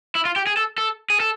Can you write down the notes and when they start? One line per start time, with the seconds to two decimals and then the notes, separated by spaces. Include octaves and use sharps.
0.15 E4
0.25 F4
0.36 G4
0.47 G#4
0.57 A4
0.78 A4
1.10 G#4
1.20 A4